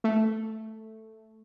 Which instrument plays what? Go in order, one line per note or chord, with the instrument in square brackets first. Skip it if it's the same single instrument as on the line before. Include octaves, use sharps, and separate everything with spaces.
[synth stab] A3